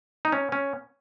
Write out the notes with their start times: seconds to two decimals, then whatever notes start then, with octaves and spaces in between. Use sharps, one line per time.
0.25 D#4
0.32 C#4
0.52 C#4